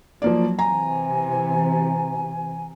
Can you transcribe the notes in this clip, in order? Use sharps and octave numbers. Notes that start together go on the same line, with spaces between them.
F3 F#3 A#3 D5
C3 E3 G#5 A#5